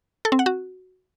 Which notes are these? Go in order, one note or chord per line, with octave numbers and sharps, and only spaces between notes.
A4
C4
F#5
F#4